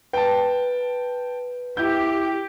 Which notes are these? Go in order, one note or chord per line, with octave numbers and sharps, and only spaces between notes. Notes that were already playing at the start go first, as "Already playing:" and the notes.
B4 G5 A5
E4 G4 G6